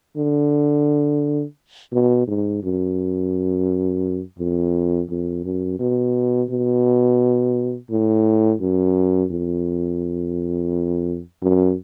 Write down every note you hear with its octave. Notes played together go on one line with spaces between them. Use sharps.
D3
B2
G#2
F#2
F2
F2
F#2
B2
B2
A2
F#2
F2
F#2